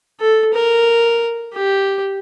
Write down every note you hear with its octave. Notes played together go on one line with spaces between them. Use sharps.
A4
A#4
G4